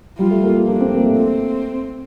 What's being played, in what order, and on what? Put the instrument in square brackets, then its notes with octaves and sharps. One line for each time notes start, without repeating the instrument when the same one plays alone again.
[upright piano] G3 [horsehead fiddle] F4
[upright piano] A3
A#3
A#3
[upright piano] A#3 [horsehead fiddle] D4
[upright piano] C4
A#3
A3
[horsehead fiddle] C4